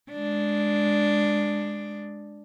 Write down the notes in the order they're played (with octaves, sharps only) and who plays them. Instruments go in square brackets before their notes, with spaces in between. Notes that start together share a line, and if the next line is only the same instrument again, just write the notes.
[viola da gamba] G#3 D4